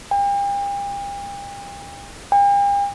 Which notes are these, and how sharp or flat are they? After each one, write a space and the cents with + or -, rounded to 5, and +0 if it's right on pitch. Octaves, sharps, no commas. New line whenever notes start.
G5 +40
G5 +45